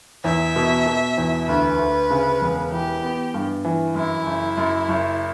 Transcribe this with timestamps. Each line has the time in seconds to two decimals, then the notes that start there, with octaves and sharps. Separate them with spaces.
0.24 E2 E5
0.56 B2
0.86 B2
1.17 E2
1.48 D2 B4
1.79 D2
2.10 C#3
2.41 E1
2.72 E3 G4
3.03 B3
3.34 G2
3.64 E3
3.95 F#2 E4
4.26 F#1
4.57 F#2
4.88 F#1